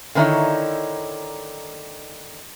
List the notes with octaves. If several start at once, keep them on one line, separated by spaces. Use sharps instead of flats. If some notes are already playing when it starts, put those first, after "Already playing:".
D3 D#3 C4 D#4 E4 C#5